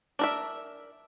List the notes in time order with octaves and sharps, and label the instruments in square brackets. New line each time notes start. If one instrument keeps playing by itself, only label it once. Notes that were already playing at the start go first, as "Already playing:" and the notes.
[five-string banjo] D4 A#4 E5